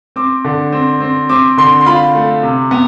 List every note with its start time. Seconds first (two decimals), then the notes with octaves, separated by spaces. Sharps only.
0.16 C4 D6
0.45 D3
0.72 C4
1.01 C4
1.29 C4 D6
1.58 D3 C6
1.81 C6
1.86 F4 B5
2.15 A3
2.43 C3
2.71 B3